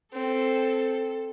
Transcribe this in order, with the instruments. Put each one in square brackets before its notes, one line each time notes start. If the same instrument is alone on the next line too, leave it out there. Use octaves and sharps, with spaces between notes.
[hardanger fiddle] C4 [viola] A4